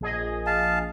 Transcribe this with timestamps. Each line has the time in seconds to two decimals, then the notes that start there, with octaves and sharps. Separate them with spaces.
0.01 A#1 G#4 D#5
0.46 F5 A5